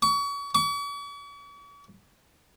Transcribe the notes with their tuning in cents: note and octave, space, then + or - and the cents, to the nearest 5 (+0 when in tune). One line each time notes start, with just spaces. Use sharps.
C#6 +35
C#6 +45